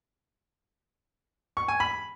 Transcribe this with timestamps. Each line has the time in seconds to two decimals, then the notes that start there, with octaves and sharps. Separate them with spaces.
1.57 C#6
1.68 G#5
1.80 B5